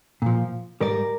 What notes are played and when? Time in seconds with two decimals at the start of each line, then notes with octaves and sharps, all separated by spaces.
0.22 A#2 F3
0.81 G#2 G3 A#4 D5